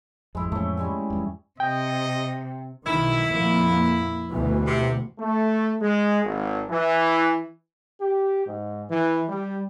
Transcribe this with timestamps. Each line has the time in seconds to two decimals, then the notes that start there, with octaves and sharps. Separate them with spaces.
0.35 A1 F2 G#3 E4
0.52 F2 A2 E3 A3 C#4
0.77 G3 G#3 G#5
1.10 E2 G2
1.60 C3 D#5 G5
2.86 B1 D#3 E4
3.29 F2 A#2 A#3
4.31 D2 B2 E3
4.67 C3
5.19 A3
5.81 G#3
6.24 G#1
6.69 E3
8.01 G4
8.45 G#2
8.89 E3
9.29 G3